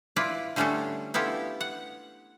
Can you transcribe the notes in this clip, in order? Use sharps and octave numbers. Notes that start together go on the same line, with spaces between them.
E4 F4 B4 D5
D3 G3 A3 C#4 D4 A4
B3 E4 F4 G4 A4
F#5